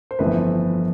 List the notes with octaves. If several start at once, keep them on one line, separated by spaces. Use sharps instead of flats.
C5
G1 F2 E3 A3 C4 B4